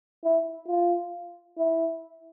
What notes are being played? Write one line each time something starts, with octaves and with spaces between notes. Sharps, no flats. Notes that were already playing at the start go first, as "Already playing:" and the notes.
E4
F4
E4